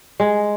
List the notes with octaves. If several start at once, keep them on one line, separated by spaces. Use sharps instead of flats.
G#3